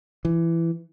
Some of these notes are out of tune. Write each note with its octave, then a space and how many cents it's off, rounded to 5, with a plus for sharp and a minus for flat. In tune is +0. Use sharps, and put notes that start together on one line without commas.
E3 +15